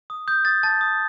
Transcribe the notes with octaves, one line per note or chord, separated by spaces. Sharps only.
D#6
D#6 G6
D#6 A6
A5 A6
D#6